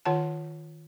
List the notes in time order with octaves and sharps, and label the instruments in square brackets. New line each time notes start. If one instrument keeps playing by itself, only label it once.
[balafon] D#3 F4 C#5 F#5 A5